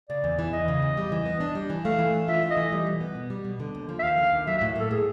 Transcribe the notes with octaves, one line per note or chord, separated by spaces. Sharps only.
C#3 D5
E2
E3
E2 D#5
C#3
E2
G3
E3
B3
D4
G3
E3
A3 F5
E3
D4
F4 E5
A3
D#5
E3
G3
B2
B3
B2
G3
B2
D3
D#2
F3
E5
D#2 F5
D3
D#2
F#3 E5
E5
A2
A#3 A4
A2 G#4